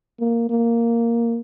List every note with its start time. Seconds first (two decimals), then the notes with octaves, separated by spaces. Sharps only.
0.20 A#3
0.50 A#3